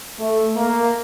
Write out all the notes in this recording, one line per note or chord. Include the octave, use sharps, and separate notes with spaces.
A3
A#3